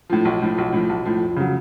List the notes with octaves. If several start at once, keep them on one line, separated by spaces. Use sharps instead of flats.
A2 F3
B1
A2 F3
B1
A2 F3
B1
A2 F3
F2
C#3 F#3